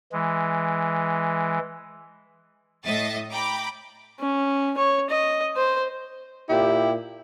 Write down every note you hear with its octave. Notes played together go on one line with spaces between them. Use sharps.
E3 G#3
A2 D#5 E5 A6
G5 A#5 B5 D6
C#4
C#5
D#5
C5
A#2 E4 G4